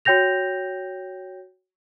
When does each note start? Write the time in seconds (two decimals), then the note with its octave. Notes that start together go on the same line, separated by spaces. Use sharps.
0.05 F#4 C#5 G5 G6 A#6 F7